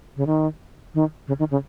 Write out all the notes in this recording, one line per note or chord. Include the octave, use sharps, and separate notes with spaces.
C#3
D#3
D#3
C#3
D#3
C#3